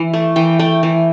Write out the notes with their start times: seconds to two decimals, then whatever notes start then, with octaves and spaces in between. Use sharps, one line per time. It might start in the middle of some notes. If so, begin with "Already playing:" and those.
Already playing: E3
0.13 A3
0.36 E3 G5
0.59 A3 G5
0.83 E3